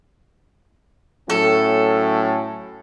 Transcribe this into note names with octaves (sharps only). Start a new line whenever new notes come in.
A2 F#3 C#4 A4